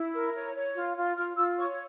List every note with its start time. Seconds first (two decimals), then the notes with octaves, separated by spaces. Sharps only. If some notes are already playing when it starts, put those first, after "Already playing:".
Already playing: E4
0.14 A#4
0.34 C#5
0.56 C#5
0.75 F4
0.96 F4
1.17 F4 F6
1.37 F4 E6
1.57 C#5 C#6